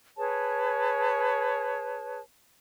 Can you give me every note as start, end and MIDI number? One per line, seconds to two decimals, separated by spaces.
0.17 2.20 68
0.17 2.20 71
0.17 2.20 73
0.17 2.20 81